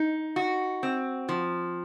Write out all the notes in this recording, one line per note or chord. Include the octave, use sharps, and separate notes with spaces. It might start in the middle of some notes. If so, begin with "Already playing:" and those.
Already playing: D#4
F#4
C4
F3